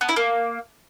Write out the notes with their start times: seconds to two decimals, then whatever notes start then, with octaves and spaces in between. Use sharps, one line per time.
0.01 B3
0.09 E4
0.16 A#3